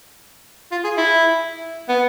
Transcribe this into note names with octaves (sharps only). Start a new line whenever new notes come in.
F4
G#4
E4
B3